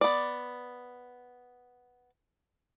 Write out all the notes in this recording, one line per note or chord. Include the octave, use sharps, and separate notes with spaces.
B3 D5